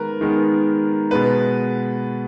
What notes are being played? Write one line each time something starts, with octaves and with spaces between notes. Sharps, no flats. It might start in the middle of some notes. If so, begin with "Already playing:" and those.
Already playing: D#3 G#3 B3 A#4 B4
D#3 G#3 B3
B2 G#3 B3 B4